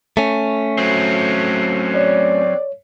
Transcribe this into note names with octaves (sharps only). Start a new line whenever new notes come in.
A3 C#4
F#3 C4
C#5 D5